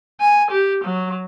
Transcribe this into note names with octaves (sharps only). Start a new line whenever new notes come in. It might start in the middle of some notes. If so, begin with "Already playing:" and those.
G#5
G4
F#3